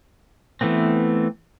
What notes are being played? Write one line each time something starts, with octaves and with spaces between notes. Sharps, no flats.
E3 A3 B3 C4